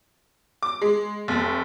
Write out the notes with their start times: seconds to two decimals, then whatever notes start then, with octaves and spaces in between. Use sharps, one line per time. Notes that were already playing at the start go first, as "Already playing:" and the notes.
0.63 D6
0.82 G#3
1.28 F1